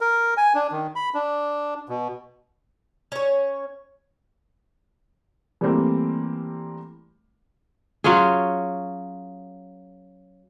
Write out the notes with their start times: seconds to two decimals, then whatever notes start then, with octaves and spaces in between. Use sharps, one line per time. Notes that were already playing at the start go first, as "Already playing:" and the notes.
0.01 A#4
0.37 G#5
0.55 D4
0.72 D#3
0.96 B5
1.14 D4
1.89 B2
3.12 C#4 C#5
5.61 E3 G3 A3 A#3 C4
8.04 F#3 C#4 F4 G#4